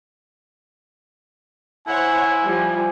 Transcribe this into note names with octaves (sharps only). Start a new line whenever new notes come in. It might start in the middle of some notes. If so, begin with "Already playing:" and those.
E4 C5 C#5 F#5 G#5
F3 G3